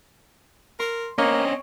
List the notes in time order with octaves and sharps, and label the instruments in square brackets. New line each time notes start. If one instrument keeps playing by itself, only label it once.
[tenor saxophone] A#4 [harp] C6
[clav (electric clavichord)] A#3 [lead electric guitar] C4 C#4 [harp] C#5 [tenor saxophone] D#5